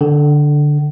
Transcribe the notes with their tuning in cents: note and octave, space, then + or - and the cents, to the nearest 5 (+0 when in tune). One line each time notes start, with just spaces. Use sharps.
D3 +0 F#5 +45